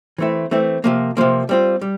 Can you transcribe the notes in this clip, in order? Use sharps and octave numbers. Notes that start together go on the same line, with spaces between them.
E3 A3 C4 E4
E3 A3 C4 E4
C3 F3 A#3
C3 F3 A#3
G3 C4 F4
G3